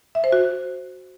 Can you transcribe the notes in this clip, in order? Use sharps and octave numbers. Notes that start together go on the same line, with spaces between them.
E5
C5
F#4